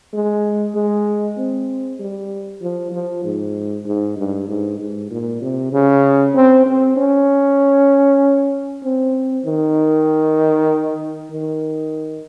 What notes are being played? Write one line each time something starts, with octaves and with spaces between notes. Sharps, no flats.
G#3
G#3
C4
G3
F3
F3
G#2
G#2
G2
G#2
G#2
A#2
C3
C#3
C4
C4
C#4
C4
D#3
D#3